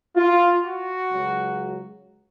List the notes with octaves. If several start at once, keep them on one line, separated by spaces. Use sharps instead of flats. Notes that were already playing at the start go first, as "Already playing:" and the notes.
F4
F#4
C#2 C#3 F#3